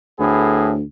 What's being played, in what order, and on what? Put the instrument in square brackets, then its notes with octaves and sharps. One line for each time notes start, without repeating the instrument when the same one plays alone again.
[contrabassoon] D2 [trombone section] A2 B3 G#4